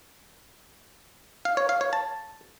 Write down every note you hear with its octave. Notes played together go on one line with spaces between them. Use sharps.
F5
C#5
F5
C#5
A5